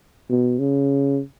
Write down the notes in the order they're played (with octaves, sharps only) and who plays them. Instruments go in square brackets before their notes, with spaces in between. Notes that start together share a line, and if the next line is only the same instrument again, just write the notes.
[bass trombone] B2
C#3